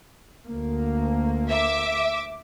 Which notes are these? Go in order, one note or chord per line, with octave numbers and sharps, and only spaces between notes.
D2 A#3
E5 D6